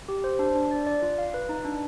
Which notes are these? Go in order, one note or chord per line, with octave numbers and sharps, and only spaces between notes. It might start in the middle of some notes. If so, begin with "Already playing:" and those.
G4
C5
D4
D4
D5
D5
F4
F5
B4
D#4
D4